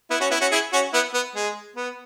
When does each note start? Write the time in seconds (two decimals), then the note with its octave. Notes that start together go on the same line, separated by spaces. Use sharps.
0.10 B3 E4
0.20 C#4 F#4
0.31 B3 E4
0.41 C#4 F#4
0.51 E4 G#4
0.73 C#4 F#4
0.93 B3 E4
1.14 B3
1.35 G#3
1.76 B3